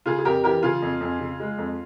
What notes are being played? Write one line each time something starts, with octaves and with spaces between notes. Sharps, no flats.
C#3 F4 G#4
G#4
F2 G4 A#4
E3 G4 A#4
C#3 F4 G#4
F2
F2
C#3
G#3
F2